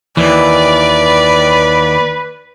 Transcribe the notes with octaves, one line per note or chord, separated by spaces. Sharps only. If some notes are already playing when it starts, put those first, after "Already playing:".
D#2 E3 B4 D5